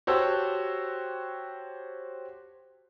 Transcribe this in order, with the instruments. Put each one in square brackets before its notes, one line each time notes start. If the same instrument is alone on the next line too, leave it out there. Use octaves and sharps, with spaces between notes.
[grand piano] F#4 G4 C5 C#5 A5 E6